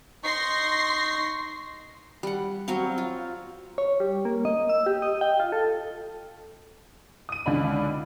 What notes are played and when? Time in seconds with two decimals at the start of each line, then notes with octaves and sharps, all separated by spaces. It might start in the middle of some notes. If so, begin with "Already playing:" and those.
0.24 D#4 C6 C#6 A#6 C7
2.23 G3 F#5
2.68 F#3 C4 C#5 F5
2.98 F4
3.78 C#5
4.00 G3
4.25 A#3
4.45 D#5
4.69 E6
4.86 G4
5.02 D#5
5.21 G5
5.40 F4
5.52 A4
7.29 D#6 D#7
7.46 C#2 D3 D4 D#4 B5